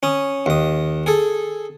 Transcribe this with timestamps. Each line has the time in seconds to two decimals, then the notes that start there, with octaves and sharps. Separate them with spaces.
0.03 C#4 D#6
0.46 D#2 D#6
1.06 G#4 A4